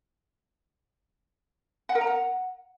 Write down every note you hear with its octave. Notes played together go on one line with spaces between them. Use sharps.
F#5
A#4
A#5
F#5